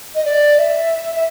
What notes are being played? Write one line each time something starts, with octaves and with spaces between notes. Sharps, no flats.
D#5
D5
E5
E5